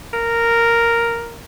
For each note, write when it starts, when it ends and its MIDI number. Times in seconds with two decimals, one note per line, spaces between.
0.13 1.41 70